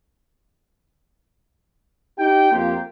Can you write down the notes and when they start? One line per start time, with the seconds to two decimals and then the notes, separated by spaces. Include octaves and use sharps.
2.18 D#4 G4 G5
2.52 F2 A#3 F4 G4 G5